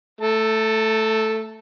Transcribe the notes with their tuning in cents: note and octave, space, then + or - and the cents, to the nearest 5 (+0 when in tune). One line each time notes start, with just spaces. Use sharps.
A3 +0 A5 +45